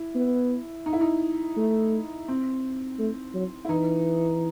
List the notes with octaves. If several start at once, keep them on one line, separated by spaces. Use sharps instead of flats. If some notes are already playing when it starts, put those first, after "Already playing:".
Already playing: E4
B3
D#4
E4
D#4
A3
C4
A3
F#3
E4
E3 D#4